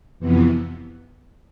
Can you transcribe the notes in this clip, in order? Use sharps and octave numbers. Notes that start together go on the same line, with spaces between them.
F2 C3 E3 B3